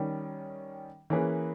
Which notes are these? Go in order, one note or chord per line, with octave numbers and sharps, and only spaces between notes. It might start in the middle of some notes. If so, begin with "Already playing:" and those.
Already playing: D#3 G3 C#4
E3 A#3 C#4 G#4 B4